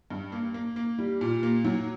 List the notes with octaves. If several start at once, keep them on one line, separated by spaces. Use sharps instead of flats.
G2
A#3
A#3
A#3
G3
A#2
A#3
F#3